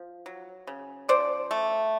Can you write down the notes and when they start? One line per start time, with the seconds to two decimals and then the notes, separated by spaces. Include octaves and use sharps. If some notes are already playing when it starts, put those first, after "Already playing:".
Already playing: F3
0.26 F#3
0.67 C#3
1.08 F3 C5 D5
1.51 A3